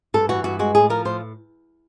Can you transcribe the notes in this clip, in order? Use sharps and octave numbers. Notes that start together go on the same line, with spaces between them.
G2 A4
E3 F#4
G2 F#4
G#3 F#4
A2 G#4
F3 A#4
A2 C5